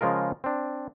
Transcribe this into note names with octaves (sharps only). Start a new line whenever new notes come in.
C#3 F3 G#3 F4 A#4
C4 D4